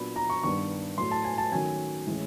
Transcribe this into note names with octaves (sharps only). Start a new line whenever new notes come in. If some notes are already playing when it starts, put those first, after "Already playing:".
Already playing: A#2 F#3 B3 D4 B5
A#5
C#6
G2 D#3 G3 B3 D4 C#6
A2 F#3 A3 C6
A5
G#5
A5
D#3 F#3 A3 C#4 G#5
A2 E3 G#3 C#4